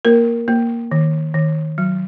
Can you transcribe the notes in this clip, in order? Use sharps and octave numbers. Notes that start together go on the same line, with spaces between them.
A#3 A#4
A#3
D#3
D#3
F#3